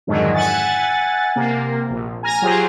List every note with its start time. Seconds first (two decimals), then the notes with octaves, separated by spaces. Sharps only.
0.07 F2 G#2 D3 D#3 F#3 G#3
0.34 E5 F#5 G#5 A6
1.36 C3 A#3
1.90 A#1
2.23 G#5 A#5 F6 A#6
2.42 F#3 F4 G4 G#4 C5